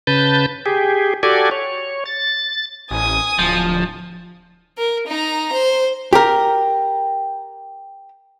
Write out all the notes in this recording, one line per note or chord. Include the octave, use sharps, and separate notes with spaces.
C#3 B4 A5 G6
G4 G#4
F#4 G4 A4 D5 G#5
C#5
A6
A1 G#5 D#6
D1 F3
A#4
D#4 A#5
C5
G4 A#4